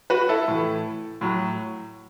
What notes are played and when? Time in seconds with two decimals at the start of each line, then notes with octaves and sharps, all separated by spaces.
0.10 F#4 B4
0.29 E4 A4
0.48 A2 E3
1.21 A2 F#3